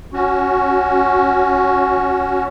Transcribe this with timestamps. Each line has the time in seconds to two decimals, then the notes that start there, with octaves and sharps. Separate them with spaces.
0.13 C#4 F#4